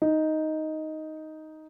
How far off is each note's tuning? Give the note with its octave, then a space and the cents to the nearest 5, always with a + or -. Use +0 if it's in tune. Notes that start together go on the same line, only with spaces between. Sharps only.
D#4 +5